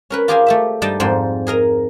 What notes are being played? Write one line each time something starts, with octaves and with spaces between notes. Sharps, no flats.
C#4 A#4 B4
F4 G4 G#4 A#4 C5 G#5
A3 G4 E5
G2 G3 D#4 D#5 G5 A5
F2 G#2 G3 C5
G#4 A#4 D#5 A#5